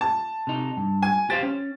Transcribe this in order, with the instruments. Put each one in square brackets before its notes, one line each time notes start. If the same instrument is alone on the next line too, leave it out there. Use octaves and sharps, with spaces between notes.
[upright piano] A5
[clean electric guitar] C3 D#4
G2
[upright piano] G#5
[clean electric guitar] G4 C5 F5 [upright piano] A6
[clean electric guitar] C#4